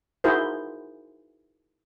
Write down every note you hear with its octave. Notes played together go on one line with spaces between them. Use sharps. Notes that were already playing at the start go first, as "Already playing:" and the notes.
D#4 E4 F#4 G#4 A#4 C5